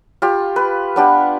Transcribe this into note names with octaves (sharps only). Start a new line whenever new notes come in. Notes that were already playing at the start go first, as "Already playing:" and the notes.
F4 G4
B4
B3 D4 G4